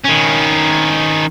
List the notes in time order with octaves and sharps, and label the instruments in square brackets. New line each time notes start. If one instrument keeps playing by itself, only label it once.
[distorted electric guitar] D#3 C#4